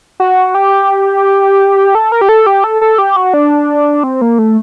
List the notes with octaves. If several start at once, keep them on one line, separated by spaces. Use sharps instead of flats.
F#4
G4
A4
A#4
G4
A4
G4
A4
A4
G4
F#4
D4
C4
A#3
A3